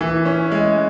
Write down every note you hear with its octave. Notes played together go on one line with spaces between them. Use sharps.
E3
C#4
G#3